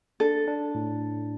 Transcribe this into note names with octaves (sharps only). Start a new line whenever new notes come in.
D4 A4
D4
A2